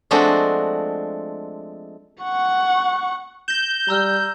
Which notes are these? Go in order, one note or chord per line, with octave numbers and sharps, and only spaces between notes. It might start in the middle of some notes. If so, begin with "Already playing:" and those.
F3 G#3 A3 C4 D4 F#4
F#5 C#6
G6 A#6 E7
G3 A#5 E6 F6